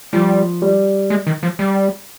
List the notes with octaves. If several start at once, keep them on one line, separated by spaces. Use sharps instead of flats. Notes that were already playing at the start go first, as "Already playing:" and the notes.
F3 G3
G3
G#3
D#3
F3
G3